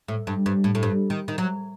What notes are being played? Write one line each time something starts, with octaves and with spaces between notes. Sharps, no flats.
A2
G2
G2
A2
A2
G2
D#3
D#3
F#3